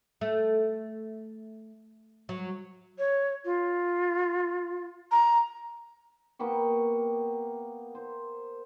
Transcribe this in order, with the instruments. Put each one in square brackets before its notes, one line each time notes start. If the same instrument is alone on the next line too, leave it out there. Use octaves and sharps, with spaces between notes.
[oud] A3
F#3
[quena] C#5
F4
A#5
[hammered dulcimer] A#3 B3 G4 C#6
C5